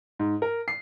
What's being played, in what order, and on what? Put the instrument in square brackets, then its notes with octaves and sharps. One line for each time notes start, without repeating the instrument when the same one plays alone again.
[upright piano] G#2
A#4
C7